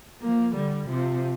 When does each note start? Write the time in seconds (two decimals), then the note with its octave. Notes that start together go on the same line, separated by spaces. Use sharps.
0.23 F3 A#3
0.57 D3 G3
0.90 C3 F3